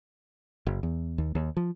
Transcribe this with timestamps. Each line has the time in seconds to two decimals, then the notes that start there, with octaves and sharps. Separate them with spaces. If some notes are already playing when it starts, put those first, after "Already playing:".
0.67 F#1
0.83 E2
1.18 D#2
1.35 D#2
1.57 F3